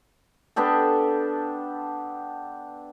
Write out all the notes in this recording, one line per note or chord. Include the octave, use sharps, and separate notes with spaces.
B3 D4 G4 A4